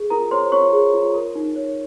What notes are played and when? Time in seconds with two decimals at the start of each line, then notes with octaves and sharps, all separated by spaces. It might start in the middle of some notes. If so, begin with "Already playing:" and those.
Already playing: G#4
0.10 F4 A#4 A#5
0.31 C5 C#5 C6
0.52 F4 C#5 C#6
0.73 G#4
0.94 F4
1.14 A#4
1.35 D#4
1.56 C#5